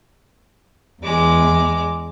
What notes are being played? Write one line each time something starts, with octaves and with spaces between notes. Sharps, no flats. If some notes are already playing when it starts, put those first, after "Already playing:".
E2 G#3 D6